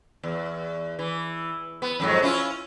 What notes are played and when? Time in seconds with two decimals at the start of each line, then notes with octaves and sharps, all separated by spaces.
0.23 E2
0.99 E3
1.82 B3
2.00 F2 G#2 F#3
2.22 C#4 E4 F4